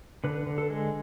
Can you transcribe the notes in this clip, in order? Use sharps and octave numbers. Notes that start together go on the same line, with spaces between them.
D3 B4
D3
A4
G#3